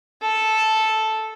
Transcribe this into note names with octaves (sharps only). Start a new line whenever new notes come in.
A4